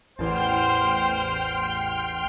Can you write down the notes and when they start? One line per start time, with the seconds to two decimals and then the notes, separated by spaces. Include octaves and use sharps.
0.19 A1 E2 C5 G5 A5 C6 F6